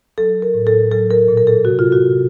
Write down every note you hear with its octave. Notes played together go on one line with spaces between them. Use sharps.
F#3 A4
A#4
A2
A4
F#3 A4
A#4
A#2
A#4
A4
C3 F#4
F4
F#4
C3